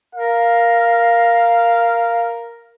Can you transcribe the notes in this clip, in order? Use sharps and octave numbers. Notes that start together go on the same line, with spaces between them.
A#4 F5